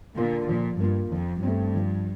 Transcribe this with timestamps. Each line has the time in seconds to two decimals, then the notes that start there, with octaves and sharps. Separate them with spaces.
0.17 A#2 D3 A#3 F4
0.49 A#2 F3
0.80 G2 A#3 F4
1.12 F2 F3
1.43 G2 A3 C4
1.75 F3